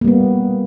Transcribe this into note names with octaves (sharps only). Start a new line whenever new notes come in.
G3 A#3 B3